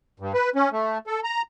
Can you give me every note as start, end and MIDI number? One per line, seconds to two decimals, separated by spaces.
0.20 0.32 43
0.34 0.50 71
0.55 0.69 61
0.72 0.98 57
1.07 1.20 69
1.24 1.42 82